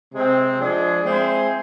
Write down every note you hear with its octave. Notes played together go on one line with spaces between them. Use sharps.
C3 G#3 C4
F3 G#3 D4 G#4
G#3 C4 E4 G#4 C5